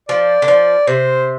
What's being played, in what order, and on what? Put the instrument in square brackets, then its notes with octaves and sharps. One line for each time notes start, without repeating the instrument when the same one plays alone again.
[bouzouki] F3 [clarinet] D5
[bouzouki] D3
F3
[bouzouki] C3 [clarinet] C5